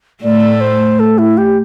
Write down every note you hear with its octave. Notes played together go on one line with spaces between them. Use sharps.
A2 A3 D5
C5
A4
E4
G4